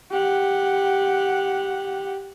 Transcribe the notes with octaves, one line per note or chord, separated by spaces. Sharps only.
G4 F#5